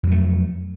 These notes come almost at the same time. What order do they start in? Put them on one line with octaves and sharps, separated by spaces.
F2 F#3 A3